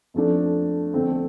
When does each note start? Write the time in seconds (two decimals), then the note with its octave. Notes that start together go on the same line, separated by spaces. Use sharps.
0.14 F2 F3 A3 D4
0.94 F2 D3 A3 C4